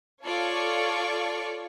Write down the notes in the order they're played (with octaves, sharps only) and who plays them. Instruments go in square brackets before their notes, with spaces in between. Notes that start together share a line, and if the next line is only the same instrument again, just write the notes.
[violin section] F4 A4 C#5 D5 C#6